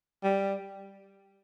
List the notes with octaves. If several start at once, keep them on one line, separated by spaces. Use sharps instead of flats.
G3